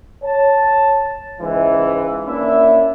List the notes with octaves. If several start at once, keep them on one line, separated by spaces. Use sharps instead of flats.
C#5 A5
C#2 G#2 E3
A#3 C#4 D4 E4 E5